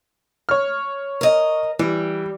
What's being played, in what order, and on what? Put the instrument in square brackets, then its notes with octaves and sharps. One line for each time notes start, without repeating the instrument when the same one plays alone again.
[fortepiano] C#5 F6
[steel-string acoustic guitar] A#4 D#5
[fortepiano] E3 [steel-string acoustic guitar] G3